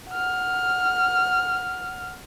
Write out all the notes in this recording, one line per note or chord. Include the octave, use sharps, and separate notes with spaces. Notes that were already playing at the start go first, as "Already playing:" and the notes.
F#5 F6